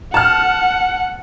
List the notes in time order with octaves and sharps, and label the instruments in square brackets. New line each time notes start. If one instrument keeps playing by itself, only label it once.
[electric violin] F#5 [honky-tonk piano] A5 F6